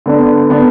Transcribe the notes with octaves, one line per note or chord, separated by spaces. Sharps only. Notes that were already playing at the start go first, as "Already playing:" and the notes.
D3 B3 D4
D3 B3 D4